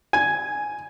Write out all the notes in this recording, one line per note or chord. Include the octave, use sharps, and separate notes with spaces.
G#5